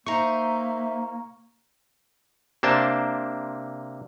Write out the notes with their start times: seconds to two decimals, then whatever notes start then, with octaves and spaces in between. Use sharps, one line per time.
0.06 A#3 D#4 C5 E5 A#5 C#6
2.63 C3 A#3 D4 C5 A5